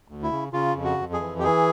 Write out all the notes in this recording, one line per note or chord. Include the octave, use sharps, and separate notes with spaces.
D2
E4
C#3
C#3 F4
F2
F#4
F2
G#4
E3
G4
E3 G#4